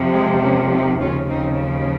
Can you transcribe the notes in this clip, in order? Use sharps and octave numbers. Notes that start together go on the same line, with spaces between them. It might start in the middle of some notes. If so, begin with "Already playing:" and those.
Already playing: F2 C3 F3
G#3 C4
A#3 C#4
C4 D#4
D#2 C#3 F3 C#4 F4
C4 D#4